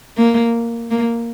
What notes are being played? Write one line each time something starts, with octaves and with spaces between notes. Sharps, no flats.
A#3
A#3